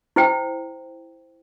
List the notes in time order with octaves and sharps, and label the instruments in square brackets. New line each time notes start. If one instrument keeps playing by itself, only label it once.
[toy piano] E4 C5 G5